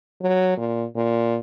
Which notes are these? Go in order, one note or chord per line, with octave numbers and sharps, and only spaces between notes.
F#3
A#2
A#2